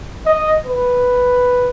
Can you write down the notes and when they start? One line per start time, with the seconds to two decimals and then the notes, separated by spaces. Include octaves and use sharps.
0.26 D#5
0.66 B4